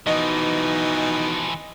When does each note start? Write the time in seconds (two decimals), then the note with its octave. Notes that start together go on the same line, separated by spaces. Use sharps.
0.07 B2 E3 F3 D#4 D#5